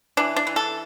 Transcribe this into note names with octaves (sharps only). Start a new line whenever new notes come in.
E3 D4
D4
E3
A4